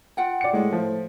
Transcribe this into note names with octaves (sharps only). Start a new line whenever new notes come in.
F4 F#5 G5
D5 C#7
A2 G#3
F3